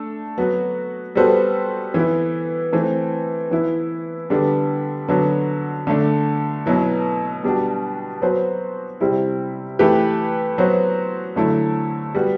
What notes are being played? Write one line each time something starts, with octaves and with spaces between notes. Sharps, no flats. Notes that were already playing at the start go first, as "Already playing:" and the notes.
Already playing: A3 D4 A4
F#3 B3 F#4
G3 B3 F#4 A4 C5
E3 B3 E4
E3 A3 C4
E3 B3 E4
D3 G3 B3 D4 A4
D3 F#3 B3 D4 F#4
D3 A3 D4
B2 F#3 B3 E4
B2 G3 D4 F#4
F#3 B3 F#4 C5
C3 G3 C4 E4
E3 A3 E4 G4 B4
F#3 B3 F#4 C5
D3 F#3 A3 E4
G3 B3 F#4